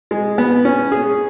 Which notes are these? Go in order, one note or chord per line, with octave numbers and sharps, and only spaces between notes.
G#3
B3
C#4
G#4